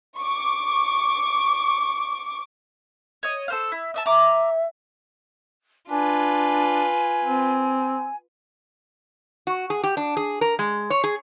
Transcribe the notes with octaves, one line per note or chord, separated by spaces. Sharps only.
C#6 D6
C#5 D#5
A4 C5 F5
E4
D#5 E5 A5
E5 A#5 D6
D4 F4 B4 G#5
C4
F#4
G#4
G4
D4
G#4
A#4
G#3
C#5
G#4